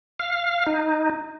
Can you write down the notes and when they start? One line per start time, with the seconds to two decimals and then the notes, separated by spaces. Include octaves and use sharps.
0.20 F5
0.66 D#4